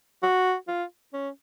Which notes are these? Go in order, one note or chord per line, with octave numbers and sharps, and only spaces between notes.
F#4
F4
C#4